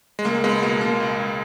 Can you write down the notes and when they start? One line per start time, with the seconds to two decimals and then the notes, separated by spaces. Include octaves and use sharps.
0.19 G#3
0.25 C#2 A#3
0.44 C#2 G#3 B3
0.62 B2 A#3
0.81 C#2 A#3
1.00 C#2
1.18 C#2